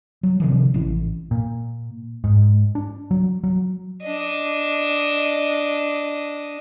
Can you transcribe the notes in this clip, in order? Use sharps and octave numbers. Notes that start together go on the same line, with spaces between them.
F#3
C3 D#3 F3
A1 E3
A#2
G#2
D4
F#3
F#3
D4 D#5